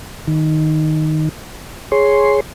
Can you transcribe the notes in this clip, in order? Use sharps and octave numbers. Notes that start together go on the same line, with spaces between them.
D#3
G#4 C#5 C6